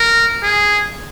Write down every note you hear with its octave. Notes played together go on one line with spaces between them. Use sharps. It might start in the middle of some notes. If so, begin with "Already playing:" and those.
Already playing: A#4
G#4